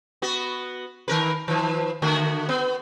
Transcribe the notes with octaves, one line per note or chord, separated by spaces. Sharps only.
B3 F#4
D#3 A#4 B4
D#3 F3
D3 A3 F#4
B3